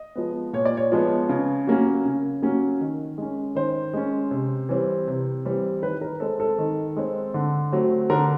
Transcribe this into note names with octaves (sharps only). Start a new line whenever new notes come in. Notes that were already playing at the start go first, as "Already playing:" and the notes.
Already playing: D#5
F3 G#3 B3
A#2 C#5
D5
C#5
F3 G#3 B3
C#3
F#3 A#3 C#4
C#3
F#3 A#3 C#4
D#3
G#3 C#4
D#3 C5
G#3 C#4
C3
E3 G3 C4
C3
E3 G3 C4
D#3 B4
A#4
G#3 C4 A4
A4
D#3
G#3 C4
D3
F#3 A3 C4
D3 A#4